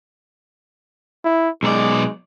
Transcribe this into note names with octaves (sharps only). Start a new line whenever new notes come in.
E4
B1 G#3 D5